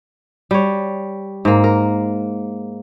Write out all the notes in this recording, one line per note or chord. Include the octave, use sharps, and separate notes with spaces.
G3 C#5
G#2 A#3
A#4